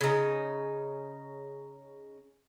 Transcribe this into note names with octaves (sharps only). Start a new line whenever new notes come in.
C#3 D#4